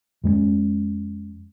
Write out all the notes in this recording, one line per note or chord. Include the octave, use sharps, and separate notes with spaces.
F2 G#3 A#3 C#4